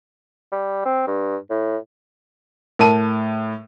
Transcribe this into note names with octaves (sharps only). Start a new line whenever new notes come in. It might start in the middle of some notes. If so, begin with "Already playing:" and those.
G3
C4
G2
A2
A2 A#4 A5 D#7